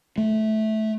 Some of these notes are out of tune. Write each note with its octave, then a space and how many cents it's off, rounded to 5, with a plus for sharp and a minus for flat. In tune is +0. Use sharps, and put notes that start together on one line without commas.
A3 -15